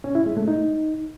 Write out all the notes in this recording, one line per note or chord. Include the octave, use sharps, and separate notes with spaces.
C#4
E4
G#3
A3
D#4